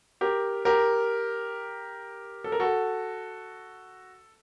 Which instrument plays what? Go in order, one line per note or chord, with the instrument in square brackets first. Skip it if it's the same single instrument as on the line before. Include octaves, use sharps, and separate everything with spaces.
[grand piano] G4 A#4
G4 A#4
A4
A#4
F#4 A4